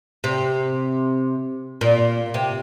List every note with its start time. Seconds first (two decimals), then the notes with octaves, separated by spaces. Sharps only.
0.24 C3
1.81 A#2
2.34 C3